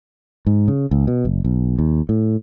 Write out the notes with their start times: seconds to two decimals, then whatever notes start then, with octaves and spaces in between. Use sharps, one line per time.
0.46 G#2
0.68 C#3
0.91 C#2
1.07 B2
1.25 F#1
1.45 B1
1.79 D#2
2.09 A2